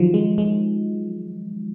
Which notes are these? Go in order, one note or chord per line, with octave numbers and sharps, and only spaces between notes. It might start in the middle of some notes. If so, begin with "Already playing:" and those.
Already playing: D#3 F3 F#3
G#3
G#3